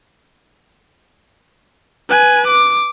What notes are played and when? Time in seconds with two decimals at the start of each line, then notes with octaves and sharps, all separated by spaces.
2.10 B4 G#5
2.47 D6